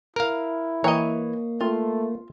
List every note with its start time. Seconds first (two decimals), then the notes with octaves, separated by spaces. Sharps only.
0.16 E4 A#4 F5
0.84 E3 A#3 C#5 D#5 A#5
1.61 A3 F4